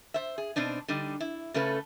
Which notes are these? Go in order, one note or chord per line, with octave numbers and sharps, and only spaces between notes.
C5 E5
G#4
B2 C4 D4 D#4
D3 G3 D#4
E4
C#3 A3 C#4 A4 B4